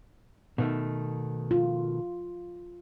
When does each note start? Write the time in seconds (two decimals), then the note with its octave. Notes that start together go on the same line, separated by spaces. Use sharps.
0.58 B2 D#3 A3
1.51 F4